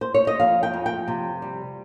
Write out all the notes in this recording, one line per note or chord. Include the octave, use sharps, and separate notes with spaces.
C5
C#5
D#5
F2 F5
G5
F2
G5
C3
G3